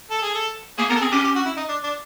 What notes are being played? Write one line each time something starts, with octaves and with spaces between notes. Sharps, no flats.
A4
G#4
A4
A#3 G#4
B3 A#4
A4
C4 G#4
C#4 G4
G4
F#4
E4
D#4
D4
D4